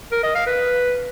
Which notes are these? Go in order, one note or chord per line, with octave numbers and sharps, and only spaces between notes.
A#4
D#5
F5
B4